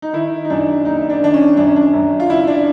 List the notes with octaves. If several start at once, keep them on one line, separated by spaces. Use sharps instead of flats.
D#4
D#3 E4
D#4
F#2 D4
F#1 D#4
D4
D#3 D4
C#4
F#2 D4
C#4
D4
F#2
F4
C#3 E4
D4